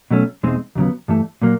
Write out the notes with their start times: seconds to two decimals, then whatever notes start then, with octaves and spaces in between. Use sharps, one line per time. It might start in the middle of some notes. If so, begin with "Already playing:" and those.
0.11 B2 F#3 A3 C#4
0.43 E2 B2 G#3 C4 D#4
0.76 D#2 C#3 F#3 B3
1.08 G2 E3 A3
1.42 A#2 F#3 A#3